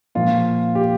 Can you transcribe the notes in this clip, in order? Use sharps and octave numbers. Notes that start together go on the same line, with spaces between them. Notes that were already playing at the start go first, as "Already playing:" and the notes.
A#2 F3 F4
G4